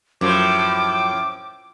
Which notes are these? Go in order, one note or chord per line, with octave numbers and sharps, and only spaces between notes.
F#2 A2 F3 C5 D6